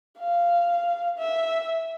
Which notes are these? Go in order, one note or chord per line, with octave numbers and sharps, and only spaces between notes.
F5
E5